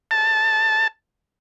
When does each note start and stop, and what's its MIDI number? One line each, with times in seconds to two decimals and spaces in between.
0.11 0.87 81